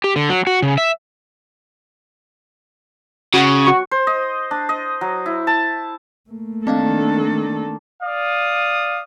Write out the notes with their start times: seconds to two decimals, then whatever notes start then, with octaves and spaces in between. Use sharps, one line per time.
0.04 G4
0.16 D3
0.29 F#3
0.47 F#4
0.62 C#3
0.78 E5
3.34 C#3 F#4
3.67 F#4 C#6
3.91 C5
4.07 D#5
4.51 D4
4.69 D#5
5.01 F#3
5.26 E4
5.47 A5
6.30 A3 A#3
6.67 D#3 C4 D4 A4 D#5 F5
8.02 D5 F5 D#6